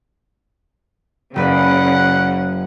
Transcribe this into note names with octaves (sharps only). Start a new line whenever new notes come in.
F#1 C#3 B4 D5 F#5